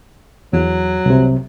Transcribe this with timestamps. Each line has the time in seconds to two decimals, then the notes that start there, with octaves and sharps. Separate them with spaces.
0.53 E2 F#3
1.06 C2 C3